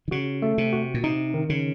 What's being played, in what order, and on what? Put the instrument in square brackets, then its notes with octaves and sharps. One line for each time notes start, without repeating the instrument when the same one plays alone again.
[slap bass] D#3
[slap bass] C#3 [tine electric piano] F#4
[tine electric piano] A3
[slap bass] C3
[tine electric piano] F#4
[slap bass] A#2
[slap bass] C3 [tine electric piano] D#4
[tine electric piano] D#3
[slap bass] C#3